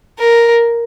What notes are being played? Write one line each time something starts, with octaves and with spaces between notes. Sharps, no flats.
A#4